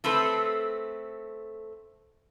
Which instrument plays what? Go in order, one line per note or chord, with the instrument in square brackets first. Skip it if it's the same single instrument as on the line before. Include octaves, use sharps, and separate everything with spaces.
[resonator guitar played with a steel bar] A3 C4 A4 B4